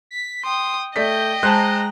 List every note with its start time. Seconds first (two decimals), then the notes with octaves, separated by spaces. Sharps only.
0.11 B6
0.44 G5 C6 D#6
0.96 A3 D5 D#5 G5 G6 B6
1.43 G#3 C5 A5 A#5 F#6